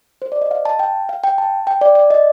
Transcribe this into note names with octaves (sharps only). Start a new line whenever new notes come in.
C5
D5
D#5
F5
A5
G5
F5
G5
A5
G5
D5
D5
D#5